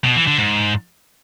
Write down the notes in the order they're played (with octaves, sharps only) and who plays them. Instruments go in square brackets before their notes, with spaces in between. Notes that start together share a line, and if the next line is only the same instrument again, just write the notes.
[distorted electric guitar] B2
E3
D3
G#2